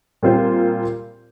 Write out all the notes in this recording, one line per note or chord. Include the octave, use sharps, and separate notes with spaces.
A#2 G3 C4 F4 C5